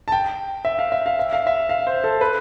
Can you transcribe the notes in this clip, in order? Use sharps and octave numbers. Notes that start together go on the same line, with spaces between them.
A5
G5
E5
F5
E5
F5
E5
F5
E5
F5
C5
A4
B4